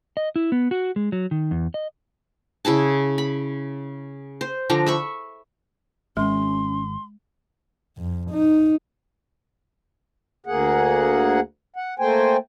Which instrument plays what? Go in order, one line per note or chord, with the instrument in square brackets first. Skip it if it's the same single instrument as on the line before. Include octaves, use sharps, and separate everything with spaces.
[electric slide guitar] D#5
E4
B3
F#4
G#3
F#3
D#3
E2
D#5
[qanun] C#3 E4 G#4 A5
B5
C5
D3 F3 D4 A#5
E5 B5 C#6
[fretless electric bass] G#1 [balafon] G#3 [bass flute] C#4 [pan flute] C6
[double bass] F2
D#4
[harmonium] D2 A#3 G#4 F#5
F#5
A3 A#3 C5 G5 G#5